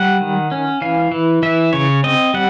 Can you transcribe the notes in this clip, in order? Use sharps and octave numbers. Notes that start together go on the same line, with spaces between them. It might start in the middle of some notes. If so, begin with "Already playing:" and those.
Already playing: G3 F#5
D#3
C#4
E3 F5
E3
E3 E5
C#3 C#5
C4 D#5
G3 F#5